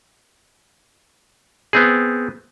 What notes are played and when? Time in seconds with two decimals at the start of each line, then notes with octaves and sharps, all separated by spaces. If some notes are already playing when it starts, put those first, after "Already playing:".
1.73 B3 C4 G#4